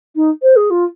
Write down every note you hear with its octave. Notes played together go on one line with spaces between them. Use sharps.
D#4
C5
G#4
F4